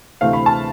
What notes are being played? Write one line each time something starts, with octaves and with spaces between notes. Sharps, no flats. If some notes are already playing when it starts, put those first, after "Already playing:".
D2 C3 E3 A3 C4 F5
B5
A5